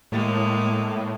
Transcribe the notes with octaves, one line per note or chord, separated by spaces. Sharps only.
A2 G#3 A#3